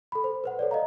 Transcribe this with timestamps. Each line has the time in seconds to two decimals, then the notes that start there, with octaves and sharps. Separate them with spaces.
0.12 A4 B5
0.24 C5
0.44 B4 C5 F#5
0.59 A4 C#5 D5
0.71 D#5 F5 A#5